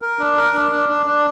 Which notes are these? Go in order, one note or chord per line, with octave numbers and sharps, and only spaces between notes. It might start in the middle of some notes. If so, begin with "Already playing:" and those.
A#4
D4
A#4
D4
D4
D4
D4